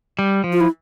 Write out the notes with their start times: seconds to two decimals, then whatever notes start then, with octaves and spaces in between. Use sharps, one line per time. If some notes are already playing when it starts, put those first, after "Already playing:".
0.19 G3
0.44 F3
0.53 F4
0.61 E4